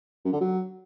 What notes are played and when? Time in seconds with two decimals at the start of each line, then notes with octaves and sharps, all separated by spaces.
0.25 F#2
0.33 D3
0.41 F#3